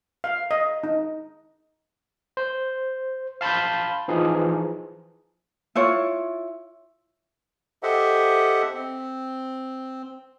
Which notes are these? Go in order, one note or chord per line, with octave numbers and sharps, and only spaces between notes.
F5
D#5
D#4
C5
F5 A5 B5 C6 G6
E3 F3 D#4 G#4
E4 F4 C#5
G4 A4 C5 D#5 E5 F#5
C4